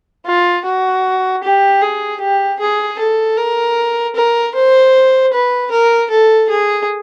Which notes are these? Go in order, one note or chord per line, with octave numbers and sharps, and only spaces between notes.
F4
F#4
G4
G#4
G4
G#4
A4
A#4
A#4
C5
B4
A#4
A4
G#4